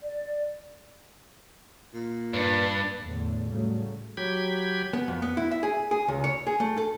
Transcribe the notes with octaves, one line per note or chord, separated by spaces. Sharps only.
D5
A#2
G2 D4 B4
E2 A2 D3
A2 C#3 F#3 G3 A3
F#3 G4 G5 B5 G#6
B3
F2
B3
E4
E5
G#4
G#4
C#2
C#5
G#4
A3
A4